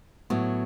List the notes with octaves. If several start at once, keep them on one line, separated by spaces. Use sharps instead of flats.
A2 F#3 B3